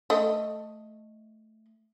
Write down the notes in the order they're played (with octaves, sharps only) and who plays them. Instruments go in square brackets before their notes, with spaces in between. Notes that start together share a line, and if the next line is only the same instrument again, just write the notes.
[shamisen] A3 D#5